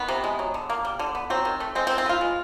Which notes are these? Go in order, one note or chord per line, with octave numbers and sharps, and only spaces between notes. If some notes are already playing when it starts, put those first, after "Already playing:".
Already playing: D#3 B3
C3
G#3
F#3
D3
A#3
G3
D3
B3
F#3 C4
D#3
A3
G#3 C4
C4
D#3
C4
B3 F4
G#3